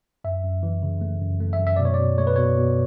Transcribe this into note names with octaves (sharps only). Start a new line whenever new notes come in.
F#2 E5
F#2
E3
C#3
A3
F#2
A3
E5
F#2
E5
B2 D5
C#5
D5
B2
A3 C#5
B4
B2 C#5
B2